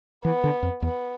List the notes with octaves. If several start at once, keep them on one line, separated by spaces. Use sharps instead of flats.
E3 B3
D3
F2
E2 B3